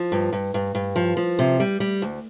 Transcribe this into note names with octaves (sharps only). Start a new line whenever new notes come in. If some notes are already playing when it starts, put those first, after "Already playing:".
Already playing: F3
G2
G2
G2
G2
F3
F3
C3
G3
G3
D2